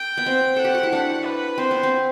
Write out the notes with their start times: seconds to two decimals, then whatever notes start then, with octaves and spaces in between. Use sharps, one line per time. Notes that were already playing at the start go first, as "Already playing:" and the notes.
Already playing: G5
0.17 B3
0.26 C4
0.56 A4 F#5
0.65 G4
0.75 F#4
0.83 E4
0.92 D4 F#5
1.25 B4
1.58 C4 C5
1.71 B3
1.83 C4